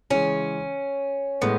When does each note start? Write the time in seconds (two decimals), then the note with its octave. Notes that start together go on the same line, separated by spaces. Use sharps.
0.10 C#3 E3 G#3 C#4
1.42 A2 G#3 B3